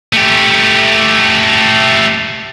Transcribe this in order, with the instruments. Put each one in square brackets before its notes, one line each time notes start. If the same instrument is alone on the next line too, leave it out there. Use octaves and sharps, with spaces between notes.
[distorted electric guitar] A3 G4